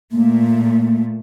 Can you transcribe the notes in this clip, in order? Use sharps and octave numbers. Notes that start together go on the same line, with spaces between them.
A#2 A3 A#3